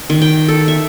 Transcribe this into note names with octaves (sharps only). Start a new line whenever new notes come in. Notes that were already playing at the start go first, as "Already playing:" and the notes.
D#3
G5
A4
E5